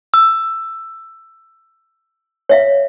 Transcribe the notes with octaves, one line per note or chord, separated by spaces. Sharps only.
E6
C#5 E5 F5